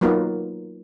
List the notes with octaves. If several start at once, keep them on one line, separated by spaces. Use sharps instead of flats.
F#3 A#3 B3 D#4 F4